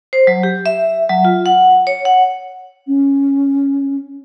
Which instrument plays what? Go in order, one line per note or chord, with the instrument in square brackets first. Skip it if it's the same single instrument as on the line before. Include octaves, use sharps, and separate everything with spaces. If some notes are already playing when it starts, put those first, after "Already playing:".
[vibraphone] C5
F#3
G4
E5
F#3
F4
F#5
C#5
F#5
[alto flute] C#4